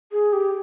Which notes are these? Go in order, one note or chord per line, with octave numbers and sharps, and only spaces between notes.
G#4
G4